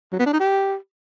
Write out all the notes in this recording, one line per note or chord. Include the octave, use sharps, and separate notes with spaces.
F#3
B3
D4
D#4
G4